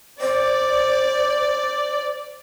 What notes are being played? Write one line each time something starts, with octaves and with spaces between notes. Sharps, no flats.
C5 D5